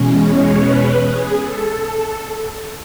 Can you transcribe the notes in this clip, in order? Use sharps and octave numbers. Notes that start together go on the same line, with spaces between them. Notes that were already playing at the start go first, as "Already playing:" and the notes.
Already playing: E2 B2 G#3 C#4
C#5
B4
G#4
A4